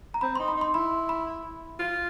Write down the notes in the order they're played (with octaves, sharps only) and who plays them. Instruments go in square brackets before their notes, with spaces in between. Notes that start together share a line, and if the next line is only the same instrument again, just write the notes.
[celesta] A#5
[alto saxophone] C4 [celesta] B5
[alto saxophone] D#4 [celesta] C6
[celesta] B5
[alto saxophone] D#4 [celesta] C6
[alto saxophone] E4 [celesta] B5
[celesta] B5
[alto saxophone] F4